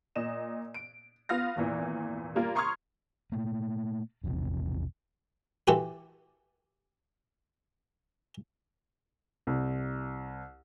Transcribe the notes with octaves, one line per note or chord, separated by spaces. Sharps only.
A#2 D#5 E7
D7
B3 F4 F5 F6 A#6
G#1 E2 A#2 E3
G3 A#3 F4 A#4
A#5 C6 C#6 D#6 F6 G#6
A#2 A3 A#3
E1 A#1 E2 C3
E3 C4 F#4 G4 A4 B4
C2